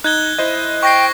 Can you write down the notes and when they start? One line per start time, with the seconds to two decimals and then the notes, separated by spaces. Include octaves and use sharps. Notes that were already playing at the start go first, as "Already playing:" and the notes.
0.04 D#4 F#6 G#6 G7
0.38 E4 C5 D#5
0.83 G5 C#6 A#6 C7